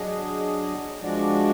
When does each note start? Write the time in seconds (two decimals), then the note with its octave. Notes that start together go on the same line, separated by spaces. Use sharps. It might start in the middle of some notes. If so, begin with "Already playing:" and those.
Already playing: F#3 D4 G#4 D#5
1.00 F3 G#3 D4 F#4 D5